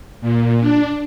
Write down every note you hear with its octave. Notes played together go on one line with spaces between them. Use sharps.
A#2
D4